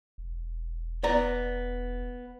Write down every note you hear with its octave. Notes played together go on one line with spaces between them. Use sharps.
E1
B3 D5 A#5